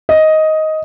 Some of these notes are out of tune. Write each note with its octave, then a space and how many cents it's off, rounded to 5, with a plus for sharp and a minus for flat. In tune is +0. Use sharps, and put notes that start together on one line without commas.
D#5 +10